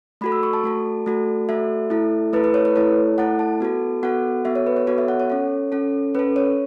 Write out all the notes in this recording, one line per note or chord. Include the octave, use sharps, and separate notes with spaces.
A3 F#4 A4 B5
E6
C#6
A5
A3 F#4 A4
A3 F#4 A4
A3 F#4 A4 E5
A3 E4 A4
A3 E4 A4 B4
B4
C#5
B4
A3 E4 A4 C#5
A3 E4 A4 F#5
A5
B3 F#4 A4
B3 F#4 A4 F#5
B3 F#4 A4 E5
C#5
B4
C#5
B3 F#4 A4 C#5
E5
F#5
C#5
C#4 A4
C#4 A4
C#4 A4 B4
C#5